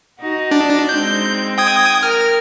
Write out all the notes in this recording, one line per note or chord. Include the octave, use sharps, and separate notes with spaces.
D#4 F#4
D4
G#3 C4 D#4 G6
G5 D#6 G#6
A#4 F6